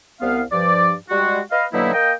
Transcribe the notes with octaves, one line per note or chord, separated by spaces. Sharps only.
C2 B3 F5
G2 F3 D5
G3 G#3 F#4
B4 D#5 F5
B2 D3 F#3 A#3 D#4 E4
A#3 D#5 G5